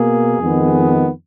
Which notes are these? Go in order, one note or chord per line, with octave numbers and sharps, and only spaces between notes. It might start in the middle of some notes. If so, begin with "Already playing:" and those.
Already playing: B2 A#3 G#4
F2 D#3 G#3 B3